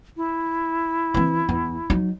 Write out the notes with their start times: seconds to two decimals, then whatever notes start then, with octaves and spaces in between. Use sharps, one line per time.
0.17 E4
1.14 E3 C4
1.49 E2
1.90 F#3 D#4